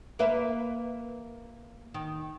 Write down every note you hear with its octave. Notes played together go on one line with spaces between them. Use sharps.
A#3 B4 E5
D#3